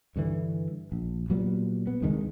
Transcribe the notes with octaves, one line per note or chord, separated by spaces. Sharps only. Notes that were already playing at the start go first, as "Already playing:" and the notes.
G2 D3 E3
A#1
A#2 F#3 G3 B3
B3
C2 D#3 F#3 G#3